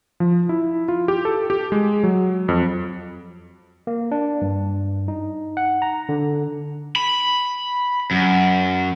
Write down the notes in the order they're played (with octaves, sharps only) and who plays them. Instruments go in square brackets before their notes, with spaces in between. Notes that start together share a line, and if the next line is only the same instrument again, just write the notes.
[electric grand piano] F3
E4
F4
G4
A4
G4
G#3
F#3
F2
[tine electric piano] A#3
D4
G2
D#4
F#5
A#5
D3
[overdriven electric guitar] B5
F#2